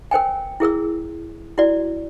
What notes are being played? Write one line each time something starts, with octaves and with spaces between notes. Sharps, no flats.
A#4 C5 G5 G#5
E4 G#4 A#4 E6
E4 F#4 D5